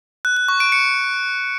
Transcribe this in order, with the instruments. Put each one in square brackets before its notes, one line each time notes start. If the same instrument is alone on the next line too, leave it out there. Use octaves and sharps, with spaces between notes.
[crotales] F#6
F#6
C#6
D7
C#7